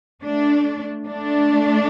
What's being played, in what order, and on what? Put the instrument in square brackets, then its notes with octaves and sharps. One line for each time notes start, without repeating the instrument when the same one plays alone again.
[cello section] A3 D4
A3 D4